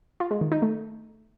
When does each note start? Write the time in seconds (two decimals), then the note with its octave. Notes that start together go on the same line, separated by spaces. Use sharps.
0.20 F4
0.31 G#3
0.41 D#3
0.52 D#4
0.62 A3